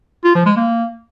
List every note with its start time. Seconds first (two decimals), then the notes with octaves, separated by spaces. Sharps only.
0.24 F4
0.35 F3
0.46 G#3
0.57 A#3